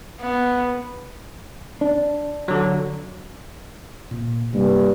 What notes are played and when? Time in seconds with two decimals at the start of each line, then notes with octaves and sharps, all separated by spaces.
0.21 B3
1.81 D4
2.48 D3 F#3
4.11 A#2
4.54 G2 C3 A#3